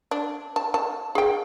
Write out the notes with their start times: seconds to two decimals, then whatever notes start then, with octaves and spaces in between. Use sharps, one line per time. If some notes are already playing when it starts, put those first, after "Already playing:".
0.11 D4
0.56 A5
0.74 A5
1.15 G#4 G5